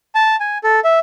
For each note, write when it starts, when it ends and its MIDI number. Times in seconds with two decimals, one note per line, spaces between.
0.15 0.36 81
0.40 0.58 80
0.64 0.80 69
0.84 0.99 76